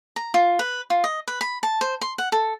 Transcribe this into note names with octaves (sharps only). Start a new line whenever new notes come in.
A#5
F4
B4
F4
D#5
B4
B5
A5
C5
C6
F#5
A4